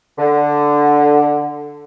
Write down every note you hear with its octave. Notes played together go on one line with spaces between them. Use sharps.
D3